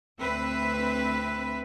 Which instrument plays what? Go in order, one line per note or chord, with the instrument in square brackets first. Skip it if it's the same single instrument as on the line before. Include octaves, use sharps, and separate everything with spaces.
[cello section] D2 C4 B4 E5